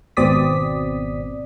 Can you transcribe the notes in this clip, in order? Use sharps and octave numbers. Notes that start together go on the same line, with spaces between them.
G#1 B2 C4 D5 D#6 B6